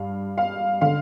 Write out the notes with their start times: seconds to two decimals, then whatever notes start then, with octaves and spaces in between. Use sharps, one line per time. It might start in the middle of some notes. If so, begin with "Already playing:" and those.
Already playing: G2 F5
0.38 F5
0.81 D3 F5